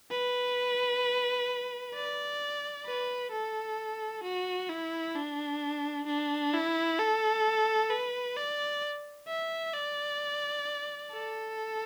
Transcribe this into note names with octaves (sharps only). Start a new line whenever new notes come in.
B4
D5
B4
A4
F#4
E4
D4
D4
E4
A4
B4
D5
E5
D5
A4